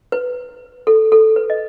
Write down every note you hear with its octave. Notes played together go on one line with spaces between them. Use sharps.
B4
A4
A4
B4
D#5